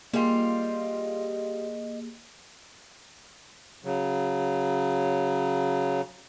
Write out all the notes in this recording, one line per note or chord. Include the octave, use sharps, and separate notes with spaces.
G3 A#3 F4 G4 G#4 D#5
C#3 F#3